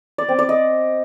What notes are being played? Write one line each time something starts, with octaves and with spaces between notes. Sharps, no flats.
D5
C4
D5
D#5